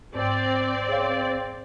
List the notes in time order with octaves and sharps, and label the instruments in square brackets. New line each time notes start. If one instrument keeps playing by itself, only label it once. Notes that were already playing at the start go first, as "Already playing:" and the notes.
[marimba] G#2 [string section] C4 D5
[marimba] G#4 C#5 F5